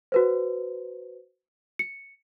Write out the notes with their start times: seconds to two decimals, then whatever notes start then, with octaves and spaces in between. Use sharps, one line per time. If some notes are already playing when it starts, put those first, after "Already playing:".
0.12 F#4 B4 C5
1.79 C#7